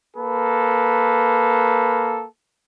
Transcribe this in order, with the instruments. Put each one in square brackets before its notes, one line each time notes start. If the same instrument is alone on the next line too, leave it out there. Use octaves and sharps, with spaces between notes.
[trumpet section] A#3 A4 B4